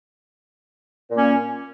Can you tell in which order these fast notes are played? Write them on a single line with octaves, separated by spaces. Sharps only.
A#2 A#3 C#4